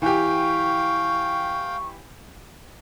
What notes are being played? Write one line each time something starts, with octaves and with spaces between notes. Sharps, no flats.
E3 G4 F5 G5 C#6